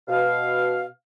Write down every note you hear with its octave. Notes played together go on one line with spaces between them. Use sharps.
B2 F5